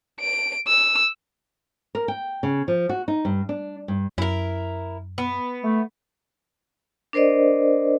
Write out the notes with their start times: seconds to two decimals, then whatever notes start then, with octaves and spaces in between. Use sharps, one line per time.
0.20 D7
0.67 E6
1.95 A#4
2.08 G5
2.43 C#3
2.68 F3
2.89 F#4
3.08 D#4
3.25 G2
3.49 D4
3.88 G2
4.18 F#2 E4 A#4
5.18 B3
5.62 A3
7.13 D4 A#4 C5 D5 D#5